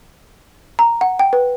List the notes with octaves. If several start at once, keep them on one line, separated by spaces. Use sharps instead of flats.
A#5
F#5
G5
B4